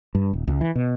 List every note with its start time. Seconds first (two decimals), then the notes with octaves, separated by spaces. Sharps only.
0.15 G2
0.33 D#1
0.47 C#2
0.61 E3
0.75 B2